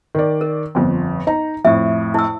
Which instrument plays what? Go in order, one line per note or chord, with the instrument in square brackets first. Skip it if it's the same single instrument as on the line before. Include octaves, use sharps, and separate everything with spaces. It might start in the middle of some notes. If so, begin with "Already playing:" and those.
[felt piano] D#3 D5
[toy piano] A#4
[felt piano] G1 F2
D#4 A#5
[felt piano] F2 A2 [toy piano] E5
[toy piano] E4 E6